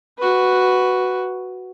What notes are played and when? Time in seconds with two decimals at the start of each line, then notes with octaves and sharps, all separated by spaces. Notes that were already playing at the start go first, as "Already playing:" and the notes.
0.19 F#4 B4